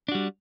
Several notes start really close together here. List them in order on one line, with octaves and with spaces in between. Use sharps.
D4 F#4 G3